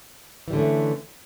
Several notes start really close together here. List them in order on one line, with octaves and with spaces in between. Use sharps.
E3 G3 D3 C#4 A3